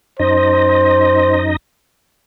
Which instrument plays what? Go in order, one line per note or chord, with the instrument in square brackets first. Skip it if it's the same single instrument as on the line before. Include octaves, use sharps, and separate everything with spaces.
[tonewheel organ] F#2 D#4 D#5 [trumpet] C5